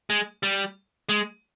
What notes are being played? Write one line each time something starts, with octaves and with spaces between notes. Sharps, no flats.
G#3
G3
G#3